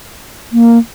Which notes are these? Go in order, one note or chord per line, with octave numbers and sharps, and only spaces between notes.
A#3